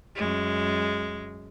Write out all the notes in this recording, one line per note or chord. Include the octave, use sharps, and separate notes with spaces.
F#2 G#3